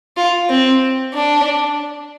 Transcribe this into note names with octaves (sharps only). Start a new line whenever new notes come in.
F4
C4
D4